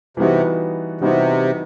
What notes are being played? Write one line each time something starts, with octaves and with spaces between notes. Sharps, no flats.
C3 E3 G3 B3 D#4 F#4
C3 E3 G3 B3 D#4 F#4